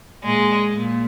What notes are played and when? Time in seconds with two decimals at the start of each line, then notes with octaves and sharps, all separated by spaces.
0.24 A#2 G#3
0.74 A#2